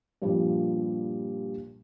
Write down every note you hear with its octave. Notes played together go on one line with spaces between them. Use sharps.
G2 A#2 F3 G3